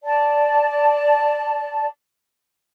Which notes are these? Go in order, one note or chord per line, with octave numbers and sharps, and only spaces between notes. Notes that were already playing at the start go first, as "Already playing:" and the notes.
D5 A5